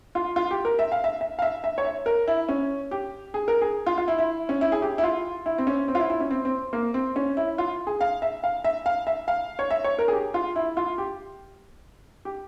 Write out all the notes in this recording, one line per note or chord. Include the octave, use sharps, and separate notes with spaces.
F4
F4
G4
A#4
E5
F5
E5
E5
F5
E5
E5
C#5
E5
A#4
E4
C#4
G4
G#4
A#4
G#4
F4
F4
E4
E4
C#4
E4
G#4
G4
E4
F4
E4
C4
C#4
C4
F4
E4
E4
C#4
C4
C4
A#3
C4
C#4
E4
F4
G#4
F5
E5
F5
E5
F5
E5
F5
C#5
E5
C#5
A#4
G#4
G4
F4
E4
F4
G4
G4